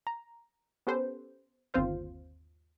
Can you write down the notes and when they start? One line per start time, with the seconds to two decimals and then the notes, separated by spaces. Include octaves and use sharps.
0.07 A#5
0.87 B3 C#4 G4 A4 B4 C5
1.74 G1 D#2 C4 F4 C5 F5